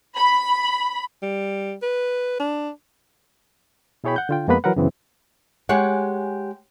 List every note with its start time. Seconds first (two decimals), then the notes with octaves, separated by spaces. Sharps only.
0.15 B5
1.22 G3
1.82 B4
2.40 D4
4.04 B2 E4 G#4 C#5 G5 B5
4.16 F#5 G6
4.29 D3 F4 G5
4.48 F2 G#3 A#3 B3 B4 B5
4.64 E3 F#3 A#4 B4 F#5
4.76 F#2 C#3 E3 B3 C4
5.69 G#3 G4 G#4 C#5 F#5